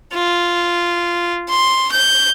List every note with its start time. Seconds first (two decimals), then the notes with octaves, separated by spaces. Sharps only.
0.14 F4
1.49 C6
1.92 G6